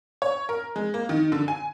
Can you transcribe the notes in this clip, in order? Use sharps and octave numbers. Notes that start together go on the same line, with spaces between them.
C#5
A#4
G#3
A#3
D#3
D3
G#5